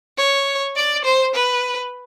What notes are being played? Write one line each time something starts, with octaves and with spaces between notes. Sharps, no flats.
C#5
D5
C5
B4